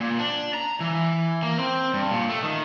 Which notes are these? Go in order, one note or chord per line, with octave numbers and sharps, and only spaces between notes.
A#2
D4
A#5
E3
A#3
C4
G2
A#2
A3
D#3